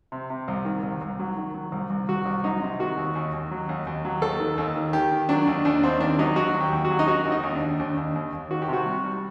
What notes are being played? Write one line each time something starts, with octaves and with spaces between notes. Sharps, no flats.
C3
C3
C2
D#3
C2
C2
F#3
D#3
F#3
C2
C2
C2 F#4
C2
F#3 D#4
C3
D#3 F#4
D#2
D#2
D#2
F#3
D#2
D#2
F#3
D#2 A4
D#3
D#2
D#3
D#3 G4
D#3
F#3 D4
D#2
D#2 D4
D#2 C4
D#3 D4
F#3 D#4
D#2 F#4
F#3
G4
D#2
F#4
F#3
D#4
D#3 F#4
D#2
D#4
D#2
D4
D#2
D#2 D4
D#2
D#2
D#2
D#3 F#4
G4
C3 F#4
G3
G3